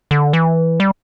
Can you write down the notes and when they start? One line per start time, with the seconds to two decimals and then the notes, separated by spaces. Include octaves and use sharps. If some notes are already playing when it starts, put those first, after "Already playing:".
0.11 D3
0.33 E3
0.80 G3